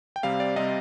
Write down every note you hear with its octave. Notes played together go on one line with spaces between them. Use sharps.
G5
C3 G3 C4 F5
D5
C3 G3 C4 D#5